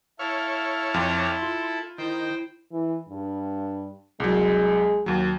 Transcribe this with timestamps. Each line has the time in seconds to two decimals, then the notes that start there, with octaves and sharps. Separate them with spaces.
0.19 E4 A4 C#5 F5
0.94 F2 C6
1.42 F4
1.98 D#3 E4 C5 G5
2.72 E3
3.09 G2
4.20 C2 F#3 G#3
5.06 D#2 F#3